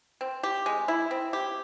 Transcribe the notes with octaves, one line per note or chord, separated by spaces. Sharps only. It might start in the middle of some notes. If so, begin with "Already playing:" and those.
C4
G4
G#3
E4
C4
G4